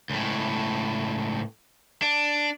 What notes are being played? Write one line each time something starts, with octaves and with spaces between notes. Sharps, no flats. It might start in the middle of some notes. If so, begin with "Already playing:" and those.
C#2 A2
D4